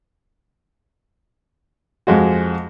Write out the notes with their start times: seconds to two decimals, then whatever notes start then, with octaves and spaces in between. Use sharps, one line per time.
2.07 F2 G#3 F#4